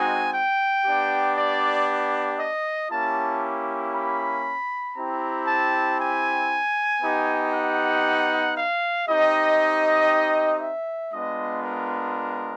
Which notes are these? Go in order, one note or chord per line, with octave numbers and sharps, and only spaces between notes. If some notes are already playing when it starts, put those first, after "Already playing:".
Already playing: G#3 C4 D#4 F#4 G#5
G5
B3 D4 G4
D5
D#5
A#3 C#4 E4 G4 A5
B5
C4 E4 G4 A#5
A5
G#5
B3 D#4 G4
F#5
F5
C4 D#4 G4 D#5
E5
G#3 B3 D4 F4 D#5
A#4